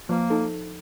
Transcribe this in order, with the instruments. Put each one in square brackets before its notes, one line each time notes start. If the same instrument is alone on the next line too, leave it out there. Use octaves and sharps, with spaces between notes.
[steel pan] F3 [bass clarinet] A#3
[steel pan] D#4 A4